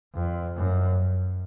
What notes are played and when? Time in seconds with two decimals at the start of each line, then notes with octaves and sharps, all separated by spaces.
0.15 F2
0.57 F#2